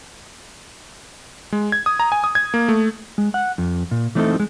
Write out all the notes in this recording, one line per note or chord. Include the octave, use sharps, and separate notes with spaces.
G#3
G#6
D#6
A#5
G#5
D#6
G#6
A#3
A3
G#3
F#5
F2
A#2
E3 A3 C4 D4 D#4 A4
G3 G#3